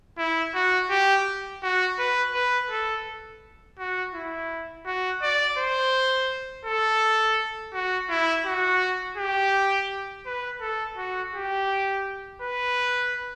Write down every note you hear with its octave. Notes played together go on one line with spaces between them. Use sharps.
E4
F#4
G4
F#4
B4
B4
A4
F#4
E4
F#4
D5
C5
A4
F#4
E4
F#4
G4
B4
A4
F#4
G4
B4